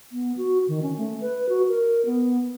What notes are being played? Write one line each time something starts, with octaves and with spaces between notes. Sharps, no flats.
B3
F#4
D#3
C#4
A3
B4
F#4
A#4
B3